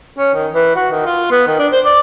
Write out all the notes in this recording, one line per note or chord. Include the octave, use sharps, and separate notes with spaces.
C#4
D#3
E3
F#4
D#3
F4
B3
D#3
D4
C5
D5